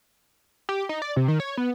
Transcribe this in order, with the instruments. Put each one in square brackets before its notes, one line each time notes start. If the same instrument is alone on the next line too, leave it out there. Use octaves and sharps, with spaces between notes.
[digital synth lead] G4
D#4
D5
C3
D#3
C#5
B3